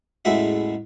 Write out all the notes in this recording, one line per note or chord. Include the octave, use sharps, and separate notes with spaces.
A1 E2 G#3 A3 F#4 E5